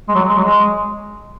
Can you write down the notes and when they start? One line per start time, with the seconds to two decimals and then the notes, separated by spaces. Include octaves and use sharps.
0.08 G#3
0.15 F#3
0.29 G#3
0.38 F#3
0.44 G#3